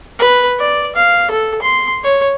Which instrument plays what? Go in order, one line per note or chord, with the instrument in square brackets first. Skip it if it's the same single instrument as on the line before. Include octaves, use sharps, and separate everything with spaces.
[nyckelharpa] B4
D5
F5
A4
C6
C#5